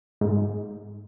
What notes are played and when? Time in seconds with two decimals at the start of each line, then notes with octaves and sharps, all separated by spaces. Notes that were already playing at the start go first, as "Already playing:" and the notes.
0.21 G#2